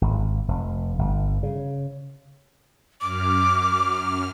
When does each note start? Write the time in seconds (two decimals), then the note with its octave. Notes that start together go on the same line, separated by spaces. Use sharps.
0.01 G#1
0.48 F1
0.99 G1
1.43 C#3
3.01 F#2 D6 F6